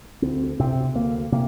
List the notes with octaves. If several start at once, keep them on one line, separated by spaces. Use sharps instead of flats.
D2 C4
C3 C4
D2 A#3
C3 A#3